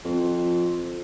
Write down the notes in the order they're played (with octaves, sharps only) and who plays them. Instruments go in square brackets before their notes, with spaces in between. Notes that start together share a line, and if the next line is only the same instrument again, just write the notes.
[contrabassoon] F2